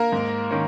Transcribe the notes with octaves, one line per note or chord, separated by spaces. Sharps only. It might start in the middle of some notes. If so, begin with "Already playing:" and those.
Already playing: A#3 A#4
G#2
D#3 C#4